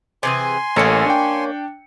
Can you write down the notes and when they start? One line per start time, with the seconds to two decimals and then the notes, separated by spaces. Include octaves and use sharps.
0.23 C3 E3 G#4 G#5 C6
0.76 A1 A#3 C#4 A4 C#7
1.06 D4 G5